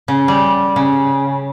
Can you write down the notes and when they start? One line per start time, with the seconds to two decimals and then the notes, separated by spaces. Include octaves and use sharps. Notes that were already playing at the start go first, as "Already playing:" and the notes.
0.08 C#3
0.28 G3
0.76 C#3